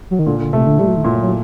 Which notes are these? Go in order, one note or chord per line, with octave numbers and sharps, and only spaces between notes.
F#3
D#3
A#2 D3
D3
C3 A3
D3
G3 A3
F#3
D#3
A#2 F#3
F#3